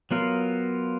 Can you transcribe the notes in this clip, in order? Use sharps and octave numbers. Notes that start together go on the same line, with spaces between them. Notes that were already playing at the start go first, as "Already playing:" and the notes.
F#3 B3 F4 A#4